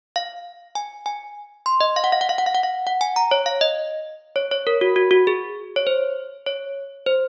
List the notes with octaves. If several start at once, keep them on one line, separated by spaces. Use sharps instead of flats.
F5
G#5
G#5
C6
D#5
F5
F#5
F5
F#5
F5
F#5
F5
F#5
F5
F#5
G#5
A#5
C#5
F5
D#5
C#5
C#5
A#4
F#4
F#4
F#4
G#4
C#5
C5
C#5
C5